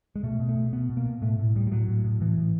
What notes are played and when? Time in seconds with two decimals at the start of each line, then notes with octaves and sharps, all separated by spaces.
0.16 G#3
0.23 B2 A3
0.40 B2
0.49 A3
0.56 B2
0.73 B2 B3
0.89 B2
0.97 A#3
1.06 B2
1.22 A2 A3
1.39 A2
1.56 A2 G3
1.67 G3
1.71 A2 F#3
1.88 A2
2.04 A2
2.20 A2 E3
2.37 A2